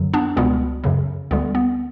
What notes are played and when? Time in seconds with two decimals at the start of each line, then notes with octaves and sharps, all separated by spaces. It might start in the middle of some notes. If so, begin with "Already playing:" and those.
Already playing: F#2 D3 F#3
0.14 B3 D4
0.37 C#2 B2 G3 B3
0.84 F#2 C#3 F#3
1.31 D2 D3 G3 B3
1.55 B3